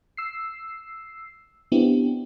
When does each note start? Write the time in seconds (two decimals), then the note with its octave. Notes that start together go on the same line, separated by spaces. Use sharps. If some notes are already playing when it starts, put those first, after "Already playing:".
0.17 E6 C7
1.72 B3 C4 D4 E4 G4